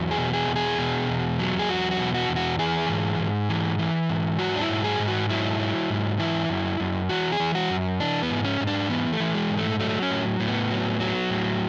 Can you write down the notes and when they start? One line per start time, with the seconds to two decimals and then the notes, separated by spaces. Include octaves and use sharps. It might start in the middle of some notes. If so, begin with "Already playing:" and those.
Already playing: E2 F#3
0.11 G#4
0.18 B2
0.33 G#4
0.48 E2
0.56 G#4
0.79 B2
1.09 E2
1.39 F#3
1.59 G#4
1.69 E2 F#4
1.91 F#4
1.99 B2
2.14 F#4
2.29 E2
2.36 F#4
2.59 E3 G#4
2.89 G#2
3.19 G#2
3.49 E3
3.79 E3
4.09 G#2
4.39 F#3 F#4
4.56 D4
4.61 E4
4.69 G#2
4.84 G#4
4.99 G#2
5.07 F#4
5.30 F#3 E4
5.59 F#3
5.90 G#2
6.19 E3 E4
6.49 F#2
6.80 F#2
7.09 E3 F#4
7.32 G#4
7.40 E3
7.55 F#4
7.70 F#2
8.00 E3 D4
8.23 B3
8.30 G#2
8.44 C#4
8.60 G#2
8.67 D4
8.89 E3 B3
9.13 A3
9.20 E3
9.35 G#3
9.50 G#2
9.57 A3
9.80 F#3 A3
10.02 C#4
10.11 A2
10.40 A2
10.48 B3
10.71 F#3
11.00 F#3
11.30 A2